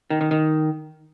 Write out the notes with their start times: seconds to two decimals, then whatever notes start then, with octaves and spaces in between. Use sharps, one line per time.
0.10 D#3
0.21 D#3
0.31 D#3